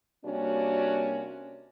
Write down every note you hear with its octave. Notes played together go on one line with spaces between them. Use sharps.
C3 G3 A#3 C#4 D4 F#4